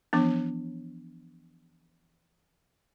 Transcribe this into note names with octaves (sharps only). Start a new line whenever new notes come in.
E3 F3 B3 D4